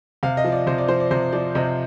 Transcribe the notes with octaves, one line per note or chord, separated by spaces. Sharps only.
C3 F5
D#5
F3
D5
C3 C5
D5
F3 C5
D5
C3 C5
F3 D5
C3 D#5